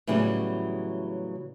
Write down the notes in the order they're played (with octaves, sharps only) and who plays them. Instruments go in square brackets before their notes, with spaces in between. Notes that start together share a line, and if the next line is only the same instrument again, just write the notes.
[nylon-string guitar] A2 C#3 E3 F#3 G3 B3